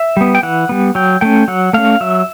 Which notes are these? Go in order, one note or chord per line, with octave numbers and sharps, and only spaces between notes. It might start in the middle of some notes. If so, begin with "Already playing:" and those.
Already playing: E5
G3 B3
G5
E3 F#5
G3 B3
F#3 G5
A3 C#4 G5
F#3 F#5
A3 C#4 F5
F#3 E5